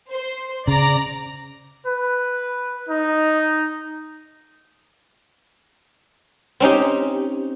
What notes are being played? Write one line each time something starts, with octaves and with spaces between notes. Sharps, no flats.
C5
C#3 D5 A#5 A#6
B4
D#4
C4 C#4 D#4 G4